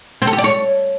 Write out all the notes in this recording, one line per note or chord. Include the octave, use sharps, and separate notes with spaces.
C4
A4
G4
D5
C#5